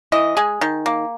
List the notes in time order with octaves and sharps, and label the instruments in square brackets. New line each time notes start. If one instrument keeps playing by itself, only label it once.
[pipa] E3 D#5
G#3 G#4
D#3
A#3